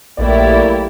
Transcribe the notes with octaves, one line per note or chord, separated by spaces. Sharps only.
A#1 F#3 A3 A#3 E4 G4 D5